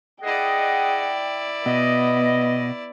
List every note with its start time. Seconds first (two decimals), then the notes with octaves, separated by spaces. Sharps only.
0.23 E4 G#4 D5 D#5 F#5 G5
1.66 B2 B3 D#5